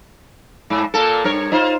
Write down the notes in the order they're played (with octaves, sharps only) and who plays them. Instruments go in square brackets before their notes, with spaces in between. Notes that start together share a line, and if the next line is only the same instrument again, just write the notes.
[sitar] G#2
A#2 A#3 A4
G2 A#4 C#5
D#4 F4 C5